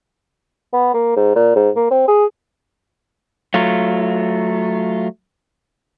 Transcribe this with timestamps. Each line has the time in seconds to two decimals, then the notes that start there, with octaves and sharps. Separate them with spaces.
0.73 B3
0.94 A#3
1.16 G#2
1.35 A#2
1.56 G#2
1.76 A#3
1.91 C4
2.08 G#4
3.54 F#3 A3 F4